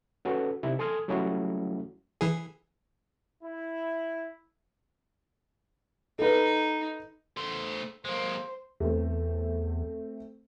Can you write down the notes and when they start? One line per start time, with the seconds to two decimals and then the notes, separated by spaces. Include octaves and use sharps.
0.25 C#4 F#4 A4 B4
0.63 C3 D#4 E4
0.79 A4 G#5 C6 D#6 F6 G#6
1.08 F#3 G3 A3 C#4 E4 F#4
2.21 E3 G#4
3.43 E4
6.19 D#4 A4 B4
7.37 A3 C5
8.05 G#3 A#3 C5
8.80 E2 A3 C4